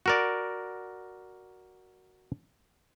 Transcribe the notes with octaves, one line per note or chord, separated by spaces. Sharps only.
F#4 A#4 D5